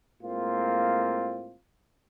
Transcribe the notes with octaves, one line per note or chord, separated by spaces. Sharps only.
A2 G#3 A#3 C4 F4